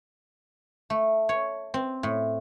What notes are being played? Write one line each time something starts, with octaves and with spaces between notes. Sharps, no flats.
A3
C#5
C4
A2